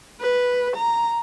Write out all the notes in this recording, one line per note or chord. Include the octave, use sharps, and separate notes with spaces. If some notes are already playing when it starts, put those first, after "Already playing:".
B4
A#5